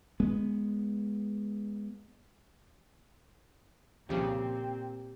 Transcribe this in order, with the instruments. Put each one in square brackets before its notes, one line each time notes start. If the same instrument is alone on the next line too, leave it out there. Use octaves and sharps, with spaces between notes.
[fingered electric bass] G#3 B3
[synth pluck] C2 C#3 F3 [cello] A#2 C4 [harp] G4 [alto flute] G5